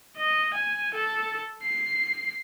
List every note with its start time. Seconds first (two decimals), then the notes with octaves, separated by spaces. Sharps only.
0.17 D#5
0.54 G#5
0.94 A4
1.63 C7